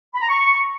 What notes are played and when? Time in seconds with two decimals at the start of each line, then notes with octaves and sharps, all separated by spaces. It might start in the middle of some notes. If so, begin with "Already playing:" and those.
0.15 B5
0.22 A#5
0.29 C#6